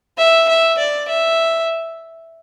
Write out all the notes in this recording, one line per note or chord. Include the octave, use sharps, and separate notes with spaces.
E5
E5
D5
E5